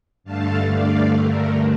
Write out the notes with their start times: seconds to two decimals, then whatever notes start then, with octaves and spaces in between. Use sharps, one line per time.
0.24 G2 D3 A3 F5 A5
0.71 D5 F5
1.18 A#4